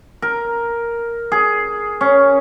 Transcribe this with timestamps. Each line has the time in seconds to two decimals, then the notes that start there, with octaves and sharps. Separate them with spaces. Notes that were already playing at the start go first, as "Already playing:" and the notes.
0.22 A#4
1.32 G#4
2.01 C#4